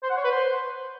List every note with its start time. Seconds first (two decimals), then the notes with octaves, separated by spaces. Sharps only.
0.03 C5
0.10 F#5
0.17 C#5
0.24 B4
0.31 C5